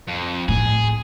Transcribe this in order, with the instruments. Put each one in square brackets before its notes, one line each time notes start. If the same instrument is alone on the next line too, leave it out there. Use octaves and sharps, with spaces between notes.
[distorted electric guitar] F2
[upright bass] A2 [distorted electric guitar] G#4